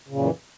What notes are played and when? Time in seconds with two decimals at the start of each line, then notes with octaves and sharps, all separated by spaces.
0.08 C#3
0.12 A#2
0.15 F#2
0.19 E3